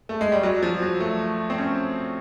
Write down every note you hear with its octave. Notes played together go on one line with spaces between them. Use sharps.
A3
G#3
G3
F#3
F3
F#3
A3
C4
C#4